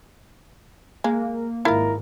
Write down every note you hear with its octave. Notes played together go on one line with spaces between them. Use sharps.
G#3 A#3
G#1 E4 F4 A#4